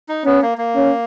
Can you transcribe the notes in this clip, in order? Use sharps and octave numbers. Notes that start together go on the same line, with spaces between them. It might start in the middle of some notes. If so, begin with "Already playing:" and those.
D#4
B3 C#4
A#3
A#3
C#4